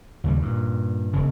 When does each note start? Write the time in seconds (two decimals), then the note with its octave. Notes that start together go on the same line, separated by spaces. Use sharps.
0.24 D#2 C#3 G3
0.42 G2 A#2
1.13 E1 C#3